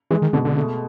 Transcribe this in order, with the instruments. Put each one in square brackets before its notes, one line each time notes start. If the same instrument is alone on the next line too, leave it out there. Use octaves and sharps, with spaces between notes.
[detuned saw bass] E3 [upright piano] G#3
[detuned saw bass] D#3
[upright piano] B2 [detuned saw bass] D3
[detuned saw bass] D3
[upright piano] A3